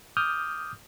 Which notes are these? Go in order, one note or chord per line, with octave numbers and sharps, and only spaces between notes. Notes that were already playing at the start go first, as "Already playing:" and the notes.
D6 D#6 F6 G6